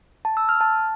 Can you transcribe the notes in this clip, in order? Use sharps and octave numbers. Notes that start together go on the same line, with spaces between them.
A5
E6
F6
A5